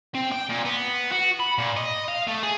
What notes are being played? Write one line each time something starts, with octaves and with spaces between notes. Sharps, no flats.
C4
G5
A#2
B3
F#4
B5
A#2
D#5
F5
A3
G#4